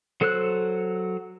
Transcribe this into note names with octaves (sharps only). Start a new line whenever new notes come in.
F#3 A4 C5 E6 F#6